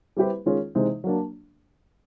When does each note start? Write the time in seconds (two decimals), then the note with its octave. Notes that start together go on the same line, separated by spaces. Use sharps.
0.17 G3 C4 E4 G4 B4
0.46 D#3 G#3 C#4 F4 G#4
0.75 C3 E3 G#3 C4 D#4
1.04 F#3 A#3 D4